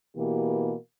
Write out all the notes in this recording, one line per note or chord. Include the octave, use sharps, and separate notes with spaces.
B2 E3 A#3 G4